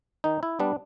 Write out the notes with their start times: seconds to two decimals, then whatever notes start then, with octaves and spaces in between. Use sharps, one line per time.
0.24 D#3 D#4
0.43 E4
0.59 G3 B3 D4